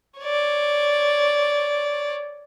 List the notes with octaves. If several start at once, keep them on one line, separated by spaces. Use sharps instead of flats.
C#5 D5